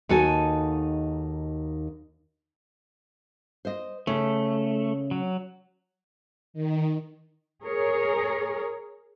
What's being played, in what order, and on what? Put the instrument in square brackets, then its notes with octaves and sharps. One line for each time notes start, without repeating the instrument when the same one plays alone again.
[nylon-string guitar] D#2 D#4 F#4 A4 G#5
C5 D#5
[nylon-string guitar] C#3 [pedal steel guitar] A3
[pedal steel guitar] F#3
[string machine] D#3
[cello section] G#4 A#4 C#5